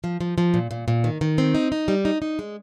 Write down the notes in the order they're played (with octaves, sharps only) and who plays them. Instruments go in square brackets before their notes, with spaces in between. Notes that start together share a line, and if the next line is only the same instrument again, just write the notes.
[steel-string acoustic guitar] F3
F3
F3
A#2
A#2
A#2
D#3
D#3
C4
D#4
D#4
G3
D#4
D#4
G#3